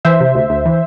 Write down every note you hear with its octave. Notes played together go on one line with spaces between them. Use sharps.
E3 C5 E5
C3
D2
D2
E3